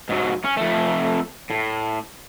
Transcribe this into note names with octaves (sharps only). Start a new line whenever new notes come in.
G#2 F#3
C#4
F2 A3
A2